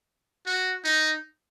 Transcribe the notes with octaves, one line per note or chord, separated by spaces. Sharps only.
F#4
D#4